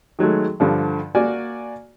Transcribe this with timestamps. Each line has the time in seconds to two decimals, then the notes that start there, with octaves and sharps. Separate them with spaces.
0.19 D#3 F#3 G#3 A3
0.60 G2 D3 F3
1.15 A#3 F#4 D5 G#5